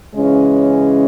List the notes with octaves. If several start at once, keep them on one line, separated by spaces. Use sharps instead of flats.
C#3 E3 G#3 C#4